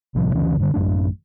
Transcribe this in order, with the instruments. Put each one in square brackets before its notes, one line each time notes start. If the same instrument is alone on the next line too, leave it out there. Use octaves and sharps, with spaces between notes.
[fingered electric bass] A#1 A2 C3 F3
D2 C#3 E3 C#4
G2 D3 A#3
A1 F#2 A3 D4